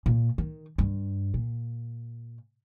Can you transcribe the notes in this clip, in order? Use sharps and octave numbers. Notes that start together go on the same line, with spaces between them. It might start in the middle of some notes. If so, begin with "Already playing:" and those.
A#2
D#3
G2
A#2